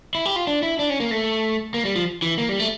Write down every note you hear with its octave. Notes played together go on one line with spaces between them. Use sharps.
E4
G4
F4
D4
E4
D4
C#4
A#3
A3
A#3
G3
F3
E3
A#3
G3
A3